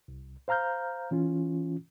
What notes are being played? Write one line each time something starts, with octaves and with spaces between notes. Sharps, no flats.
C2
C5 F5 A#5 F6 G6
E3 C#4 F4